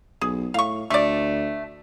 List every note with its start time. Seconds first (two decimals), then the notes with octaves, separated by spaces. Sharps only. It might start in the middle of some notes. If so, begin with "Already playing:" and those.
0.21 B1 G#4
0.54 A2 F5 C#6
0.90 D2 A3 D5